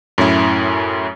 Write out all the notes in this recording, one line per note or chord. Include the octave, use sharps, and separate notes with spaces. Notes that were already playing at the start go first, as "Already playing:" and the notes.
F#2 A2 C#4 E4